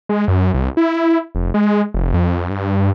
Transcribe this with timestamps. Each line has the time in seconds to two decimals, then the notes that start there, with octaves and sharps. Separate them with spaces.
0.09 G#3
0.28 F#2
0.54 C2
0.77 E4
1.35 F1
1.54 G#3
1.94 F1
2.14 F2
2.50 G2